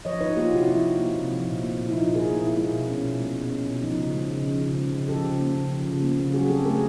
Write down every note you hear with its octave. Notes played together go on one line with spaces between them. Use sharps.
F3 C#5 D#5
D#4 B4 C#5
A#3 F4 G4
C3 E4 F#4
F3 E4
D#4
A#3
C3
F3
A#2
A#3
A#2
E4
F3 D#4 F4
A#2
G#4 A#4
A#3
A#2 E4
G#3 E4
B2
C#4
B2
G#3
B2
C#4
B2
F3 D#4
C#3
G#3
C#3
F3
C#3
G#3
C#3
F3 G4 A4
C#3
A#3
C#3
F3
C#3
A#3
C#3
F#3 F#4 G#4
C4 G4 A4
A3 G#4 A#4